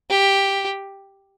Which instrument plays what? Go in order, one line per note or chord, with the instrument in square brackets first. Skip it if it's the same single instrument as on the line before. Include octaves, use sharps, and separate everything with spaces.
[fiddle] G4